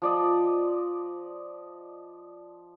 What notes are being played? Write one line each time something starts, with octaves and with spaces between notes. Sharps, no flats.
F3 D5 D#5